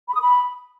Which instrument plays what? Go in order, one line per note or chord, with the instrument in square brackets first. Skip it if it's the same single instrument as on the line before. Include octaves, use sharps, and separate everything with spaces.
[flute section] B5
D#6
B5